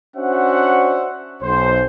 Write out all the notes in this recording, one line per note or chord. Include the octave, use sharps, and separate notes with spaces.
C#4 D4 F#4 C5 E5 F#5
B1 C5